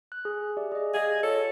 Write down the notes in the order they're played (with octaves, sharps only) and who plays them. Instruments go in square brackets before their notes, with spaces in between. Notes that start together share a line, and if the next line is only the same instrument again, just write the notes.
[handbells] F#6
G#4
G4 D5 E5
G#4 D#5
[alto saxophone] G#4 [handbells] D#5 F5
[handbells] F4 C#5 [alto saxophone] A4